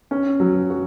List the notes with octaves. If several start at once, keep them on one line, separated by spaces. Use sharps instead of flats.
C#4
F#3
F#4